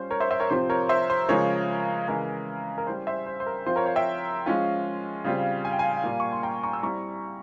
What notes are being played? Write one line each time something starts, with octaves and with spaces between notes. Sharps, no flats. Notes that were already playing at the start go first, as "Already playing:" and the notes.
Already playing: G3 C#4 F4 C5
A#4 C#5
C5 E5
C5 E5
A#4 C#5
C3 F3 C4 F4 C5
A#4 C#5
C5 E5
C5
C#3 F3 G#3 A#4 C#5
C#3 E3 G#3 E4 A#4
A#4
G3 C#4 E4 C5
C5 E5
C5
C5
A#4
F3 C4 F4 C5
A#4 C#5
C#5 F5
E5 G5
F3 G#3 C#4 F4
C#3 G3 C4 F4
G#5
G5
F5 G#5
A#2 G3 A#3 F4
C#6
C6
G5 A#5
A#5 C#6
E6
G3 C4 E4 A#5 C#6